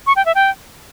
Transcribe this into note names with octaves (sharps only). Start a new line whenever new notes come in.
C#6
G5
E5
G5